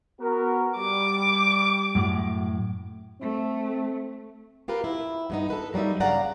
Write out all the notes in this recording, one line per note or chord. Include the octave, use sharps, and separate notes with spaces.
B3 F#4 A#4
G3 D6
F#2 A2
A3 C4
F4 G4 A#4 B4
E4
G2 B3 D#4
A4 B4
F#3 G3 A#3 D#4 E5
G2 C#3 D5 F5 F#5 A#5